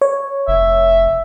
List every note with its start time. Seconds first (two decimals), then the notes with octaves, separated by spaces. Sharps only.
0.02 C#5
0.48 F1 E5